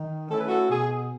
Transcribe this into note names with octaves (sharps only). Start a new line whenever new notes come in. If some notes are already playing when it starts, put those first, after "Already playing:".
Already playing: D#3
A3 C#4 E4 A4
B4
F#4 A4
B2 G#4